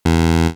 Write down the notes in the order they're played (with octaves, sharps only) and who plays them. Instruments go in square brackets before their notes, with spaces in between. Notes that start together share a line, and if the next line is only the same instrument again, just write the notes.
[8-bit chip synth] E2